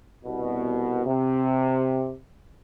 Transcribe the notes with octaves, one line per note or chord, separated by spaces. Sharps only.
C2 B2
C3